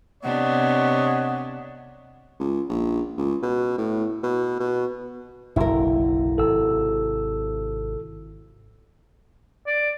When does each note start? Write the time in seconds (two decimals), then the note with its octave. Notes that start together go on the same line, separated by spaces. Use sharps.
0.23 C3 B3 D4 C#5 D#5 F#5
2.39 C#2
2.69 A#1
3.18 C#2
3.43 B2
3.78 A2
4.23 B2
4.60 B2
5.56 F#1 B1 D3 E4 A#4
6.38 G#1 C3 A4 E6
9.67 D5